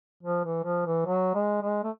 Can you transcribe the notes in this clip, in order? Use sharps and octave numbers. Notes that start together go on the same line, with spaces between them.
F3
E3
F3
E3
F#3
G#3
G#3
A3